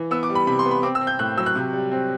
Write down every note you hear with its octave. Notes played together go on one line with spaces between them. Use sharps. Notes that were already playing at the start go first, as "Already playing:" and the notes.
Already playing: E3
B3 E6
D6
G3
B5
C3 B5
C6
B3
B5
C4 D6
E6
C4
G6
A2 F#6
F#3 E6
F#6
C3
G3
C4